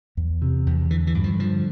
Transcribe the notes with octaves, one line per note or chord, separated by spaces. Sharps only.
E2
C3
E2
D3 E3
E3
G2
F3
D3 F3